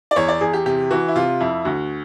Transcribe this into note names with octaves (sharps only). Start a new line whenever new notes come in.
D5
E2 C#5
D5
E2 G#4
G4
C3 G4
E3 F#4
E4
C3 F4
F2 E4
D2 F#4